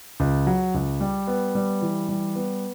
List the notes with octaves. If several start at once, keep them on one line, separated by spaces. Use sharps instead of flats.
C#2
F#3
C#2
G3
B3
G3
E3
G3
B3